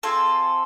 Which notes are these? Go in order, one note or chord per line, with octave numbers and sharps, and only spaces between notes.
C4 F4 G#4 A4